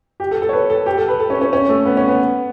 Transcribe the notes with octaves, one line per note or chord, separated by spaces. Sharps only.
G4
A4
A4
C#5
B4
A4
G4
A4
B4
A4
C#4
C#4
C#4
A3
B3
C#4
B3